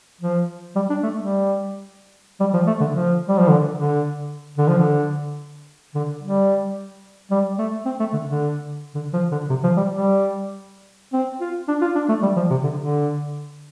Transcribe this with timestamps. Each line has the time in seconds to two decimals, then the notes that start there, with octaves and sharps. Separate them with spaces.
0.21 F3
0.75 G3
0.89 D4
1.03 A3
1.17 G3
2.40 G3
2.53 F3
2.67 A3
2.81 D3
2.94 F3
3.28 G3
3.39 F3
3.49 D3
3.76 D3
4.58 D3
4.68 F3
4.78 D3
5.94 D3
6.22 G3
7.31 G3
7.58 A3
7.85 C4
8.00 A3
8.13 D3
8.27 D3
8.95 D3
9.13 F3
9.31 D3
9.50 C3
9.63 F3
9.77 G3
9.90 G3
11.13 C4
11.41 F4
11.68 D4
11.81 F4
11.95 D4
12.08 A3
12.22 G3
12.36 F3
12.50 C3
12.63 D3
12.77 D3